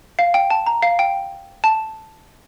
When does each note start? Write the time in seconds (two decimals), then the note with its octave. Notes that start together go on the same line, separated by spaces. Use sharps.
0.19 F5
0.34 G5
0.50 A5
0.66 A#5
0.83 F5
0.99 G5
1.64 A5